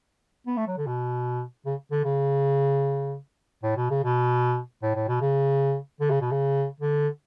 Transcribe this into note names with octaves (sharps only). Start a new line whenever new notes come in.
B3
A3
F#3
D3
B2
C#3
D3
C#3
A2
B2
C#3
B2
A2
A2
B2
C#3
D3
C#3
B2
C#3
D3